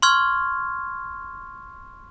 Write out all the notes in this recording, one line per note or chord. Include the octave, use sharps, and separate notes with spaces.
C6 C#6 F6 G#6